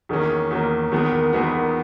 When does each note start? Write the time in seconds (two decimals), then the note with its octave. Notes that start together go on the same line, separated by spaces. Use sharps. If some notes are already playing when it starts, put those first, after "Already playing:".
0.09 E2 D#3 A#3 C#4 G#4
0.51 E2 D#3 A#3 C#4
0.92 E2 D#3 G#3 B3 G#4
1.12 A#4
1.33 E2 D#3 G#3 B3 B4
1.53 A#4